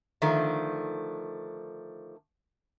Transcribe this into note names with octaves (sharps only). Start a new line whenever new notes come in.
D3 D#3 F3 A3